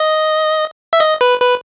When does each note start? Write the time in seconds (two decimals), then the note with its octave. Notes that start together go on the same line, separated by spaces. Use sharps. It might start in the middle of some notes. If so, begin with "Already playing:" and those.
Already playing: D#5
0.93 E5
1.00 D#5
1.21 B4
1.40 B4